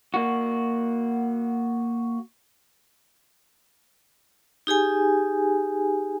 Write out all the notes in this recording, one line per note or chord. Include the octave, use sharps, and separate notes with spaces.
A#3 F#4
D#4 G4 G#4 G#5